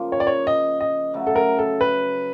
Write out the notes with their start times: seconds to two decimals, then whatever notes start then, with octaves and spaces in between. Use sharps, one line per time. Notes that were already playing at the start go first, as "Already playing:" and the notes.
Already playing: C#3 F3 A#3
0.12 C#5
0.20 D5
0.27 C#5
0.47 D#5
0.81 D#5
1.14 C#3 F#3 A3
1.27 A4
1.36 A#4
1.59 A4
1.81 B4